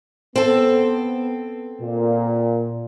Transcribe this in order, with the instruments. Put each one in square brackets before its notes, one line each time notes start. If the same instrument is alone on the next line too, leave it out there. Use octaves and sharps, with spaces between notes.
[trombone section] B3 [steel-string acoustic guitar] C4 A4
[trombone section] A#2